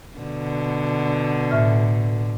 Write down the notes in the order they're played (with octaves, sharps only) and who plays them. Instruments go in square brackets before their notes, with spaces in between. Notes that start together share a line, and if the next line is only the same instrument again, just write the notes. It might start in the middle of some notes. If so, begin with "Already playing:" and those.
[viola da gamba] B2 D3
[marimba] A2 E5 F6